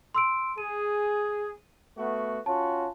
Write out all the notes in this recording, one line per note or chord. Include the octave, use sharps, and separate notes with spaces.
C6 E6 D7
G#4 D#7
A3 B3 F#4
C#4 F4 F#4 A5